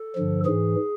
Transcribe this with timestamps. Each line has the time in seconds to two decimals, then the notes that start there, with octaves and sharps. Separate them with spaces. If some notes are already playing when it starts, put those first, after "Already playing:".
Already playing: A4
0.16 G2 D3 F3
0.45 G#2 E3 G#4